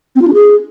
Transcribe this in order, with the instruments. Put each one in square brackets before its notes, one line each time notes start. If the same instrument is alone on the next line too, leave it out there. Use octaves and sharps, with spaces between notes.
[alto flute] C4
F4
D4
G#4